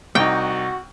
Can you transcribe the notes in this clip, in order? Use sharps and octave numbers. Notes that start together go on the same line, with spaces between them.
C2 D#4 F#4 G5